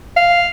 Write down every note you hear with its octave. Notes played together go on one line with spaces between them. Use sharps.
F5